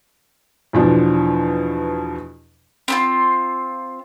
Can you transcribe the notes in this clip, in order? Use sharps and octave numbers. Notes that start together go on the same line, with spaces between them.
E2 B2 F3 D4
C4 E4 F4